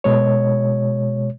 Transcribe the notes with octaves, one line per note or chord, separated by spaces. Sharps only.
B2 G#3 C#5